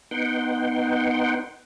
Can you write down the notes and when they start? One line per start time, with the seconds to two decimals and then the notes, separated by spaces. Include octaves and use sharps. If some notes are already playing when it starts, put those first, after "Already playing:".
0.11 B3 D#4 F#5 G5 C6